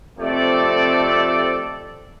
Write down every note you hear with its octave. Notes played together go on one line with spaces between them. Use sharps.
F2 C3 A3 C4 A4 D5